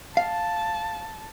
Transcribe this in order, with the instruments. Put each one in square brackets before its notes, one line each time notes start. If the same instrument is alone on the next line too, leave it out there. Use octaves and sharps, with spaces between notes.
[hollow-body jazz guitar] F5 [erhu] A5